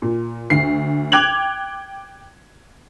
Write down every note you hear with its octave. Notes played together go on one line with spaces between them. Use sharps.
A#2
D2 C7
G5 D6 F#6 G#6 F7 F#7